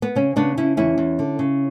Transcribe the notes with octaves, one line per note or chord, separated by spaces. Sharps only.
B3
C#3 C#4
C#3 B3 D4
C#3 C#4 E4
E2 C#4 E4
E2
D3
C#3